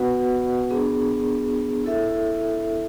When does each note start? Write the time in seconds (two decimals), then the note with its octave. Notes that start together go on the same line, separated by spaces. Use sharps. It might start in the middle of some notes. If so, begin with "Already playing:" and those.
Already playing: B3 F#4 B4 F#5
0.70 B3 D4 G#4
1.84 E4 A4 E5